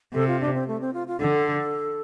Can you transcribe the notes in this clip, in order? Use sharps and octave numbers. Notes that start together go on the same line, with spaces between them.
C3 A4
F4
D4
C4
A3
C4
F4
F4
D3 A4